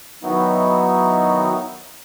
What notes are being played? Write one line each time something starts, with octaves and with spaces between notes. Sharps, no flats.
D#3 F#3 B3 D#4 E4 F#4